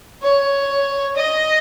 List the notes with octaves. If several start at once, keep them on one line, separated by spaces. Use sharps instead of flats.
C#5
D#5